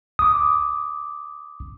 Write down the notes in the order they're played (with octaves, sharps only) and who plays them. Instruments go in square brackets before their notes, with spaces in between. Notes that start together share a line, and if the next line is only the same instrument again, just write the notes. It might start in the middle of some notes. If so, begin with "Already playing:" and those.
[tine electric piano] D6 D#6